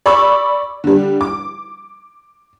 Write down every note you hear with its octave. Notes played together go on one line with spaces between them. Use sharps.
D5 B5 C#6 D6 E6
D3 G3
D6